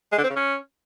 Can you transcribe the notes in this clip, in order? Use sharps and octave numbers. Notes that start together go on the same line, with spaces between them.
G#3
D3
C4
C#3
C#4